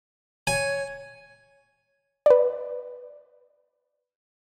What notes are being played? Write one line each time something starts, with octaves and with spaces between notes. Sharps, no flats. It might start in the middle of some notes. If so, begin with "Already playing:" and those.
C#5 G#5
B4 D5